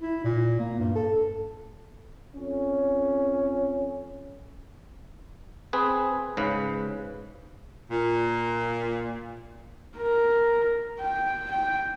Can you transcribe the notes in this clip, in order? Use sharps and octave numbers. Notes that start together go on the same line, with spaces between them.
E4
A#2
A#3
G2
A4
F2 C#4
C4 G#4 B4
G#2 C#3 B4
A#2
A#4
G5
G5